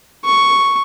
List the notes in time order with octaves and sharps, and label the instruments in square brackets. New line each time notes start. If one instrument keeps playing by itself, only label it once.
[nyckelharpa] C#6